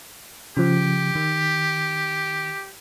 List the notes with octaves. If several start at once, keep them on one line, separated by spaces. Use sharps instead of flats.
C#3 F3 G4
D#3